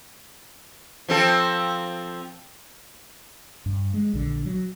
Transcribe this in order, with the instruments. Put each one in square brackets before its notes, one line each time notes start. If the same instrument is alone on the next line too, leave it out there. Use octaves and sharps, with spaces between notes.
[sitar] F3 C4 A4
[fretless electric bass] G2
G#3
A#1 D3
F#3